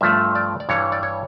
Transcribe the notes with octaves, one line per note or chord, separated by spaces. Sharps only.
G2 F3 A3 E5
D5
D5
G2 E3 G3 C#5
D5
C#5